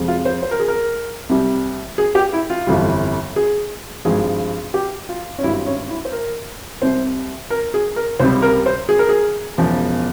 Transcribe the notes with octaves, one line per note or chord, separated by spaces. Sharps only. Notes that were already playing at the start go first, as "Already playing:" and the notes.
Already playing: F2 C3 F3 G#3
F4
C5
C5
A#4
G#4
A#4
C2 C3 G3
G#4
G4
E4
F4
G1 F2 E3 G3
G#4
G#1 G2 F3 G#3 G#4
G4
F4
C#4
G#1 G2 G3 E4
C#4
E4
C5
A#4
C2 C3 G3 C5
A#4
G#4
A#4
C#2 C3 G3 C5
A#4
C5
G#4
A#4
G#4
E1 E2 C#3 F3